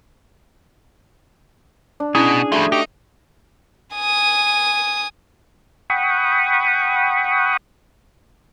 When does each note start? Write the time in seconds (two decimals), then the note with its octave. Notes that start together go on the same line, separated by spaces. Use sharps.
2.00 D4
2.15 B2 C#4 E4 G#4 A#5
2.52 F3 G3 A3 F#4
2.72 D#4 G4
3.96 G#5 D#6
5.90 F#5 G5 B5 C#6 D#6